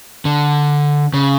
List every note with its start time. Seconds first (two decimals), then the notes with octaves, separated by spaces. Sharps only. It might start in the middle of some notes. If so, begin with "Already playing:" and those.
0.25 D3
1.14 C#3